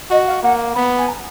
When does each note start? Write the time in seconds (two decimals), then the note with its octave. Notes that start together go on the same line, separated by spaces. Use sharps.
0.10 F#4 D#5
0.27 F5
0.43 A#3 F#5
0.75 B3 B5
0.98 G#5
1.08 A#5